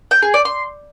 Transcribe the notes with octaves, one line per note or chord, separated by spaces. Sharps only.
G5
G#4
D5
C6